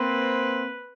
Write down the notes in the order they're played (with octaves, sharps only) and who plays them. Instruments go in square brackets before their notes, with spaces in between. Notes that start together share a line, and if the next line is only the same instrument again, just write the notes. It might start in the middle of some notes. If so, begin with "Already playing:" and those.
Already playing: [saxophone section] A#3 C4 [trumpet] B4